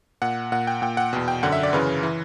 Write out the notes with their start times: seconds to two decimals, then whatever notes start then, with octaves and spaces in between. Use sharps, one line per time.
0.22 A#2 F#5
0.52 A#2 F#5
0.67 G5
0.82 A#2 G5
0.97 F#5
1.13 E2 B2
1.28 G5
1.43 F#2 D3 F#5
1.52 E5
1.63 D5
1.73 F#2 C#3 E3 B4
2.03 E3